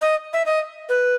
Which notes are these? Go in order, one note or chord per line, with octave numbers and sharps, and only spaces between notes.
D#5
E5
D#5
B4